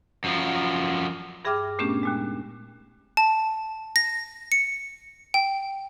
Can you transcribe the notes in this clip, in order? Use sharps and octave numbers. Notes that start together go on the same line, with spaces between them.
F#2 F3
G2 G#4 E5 G5 D6 F6
A#2 A3 B3 C#4 D4 G4
D#2 A#2 G#3
A5
A#6
C#7
G5